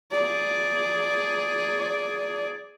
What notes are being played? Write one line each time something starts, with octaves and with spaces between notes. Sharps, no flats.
G#4 D5